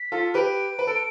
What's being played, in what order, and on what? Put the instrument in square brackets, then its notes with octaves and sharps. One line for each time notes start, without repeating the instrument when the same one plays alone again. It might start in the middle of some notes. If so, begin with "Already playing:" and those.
Already playing: [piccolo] B6
[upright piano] F4 A4
[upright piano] G4 B4 [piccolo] D7
[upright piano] B4
A4